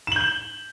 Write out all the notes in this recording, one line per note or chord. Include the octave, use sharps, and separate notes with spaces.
G6 E7 F#7 G7